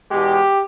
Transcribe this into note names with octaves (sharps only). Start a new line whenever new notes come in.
E2 B2 G#3 G4